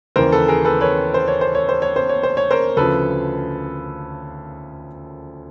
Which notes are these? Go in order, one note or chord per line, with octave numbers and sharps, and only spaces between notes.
D#2 C#3 E3 A#4 C5
A4 B4
G#4 A#4
A4 B4
B4 C#5
C5
C#5
C5
C#5
C5
C#5
C5
C#5
C5
C#5
A#4 C5
D2 C#3 F3 A4 B4